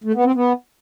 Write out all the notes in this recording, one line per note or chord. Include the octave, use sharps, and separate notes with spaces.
A3
B3
C4
B3